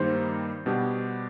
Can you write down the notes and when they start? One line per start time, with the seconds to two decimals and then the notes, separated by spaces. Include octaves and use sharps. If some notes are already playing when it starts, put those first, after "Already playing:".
Already playing: G2 D#3 G3 A#3 D#4 C5
0.66 B2 G3 B3 D4 G4